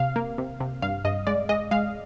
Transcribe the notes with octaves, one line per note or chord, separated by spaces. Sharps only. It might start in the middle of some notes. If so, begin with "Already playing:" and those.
Already playing: C3 F5
A#3
C3
C3
G2 F5
G2 D#5
G#3 D5
G#3 D#5
G#3 F5